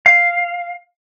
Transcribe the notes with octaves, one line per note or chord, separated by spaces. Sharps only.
F5